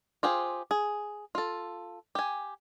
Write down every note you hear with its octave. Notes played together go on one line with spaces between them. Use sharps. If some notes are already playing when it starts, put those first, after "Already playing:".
F4 G4 G#4 C5
G#4
F4 A4
G4 G#5